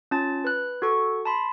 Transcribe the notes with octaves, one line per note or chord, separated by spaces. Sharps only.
C#4 F4 A5 A6
B4 F#6
F#4 A4 C#6
A5 B5 C6